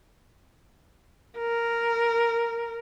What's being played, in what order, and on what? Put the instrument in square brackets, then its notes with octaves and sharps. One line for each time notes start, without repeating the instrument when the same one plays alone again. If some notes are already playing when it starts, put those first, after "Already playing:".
[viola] A#4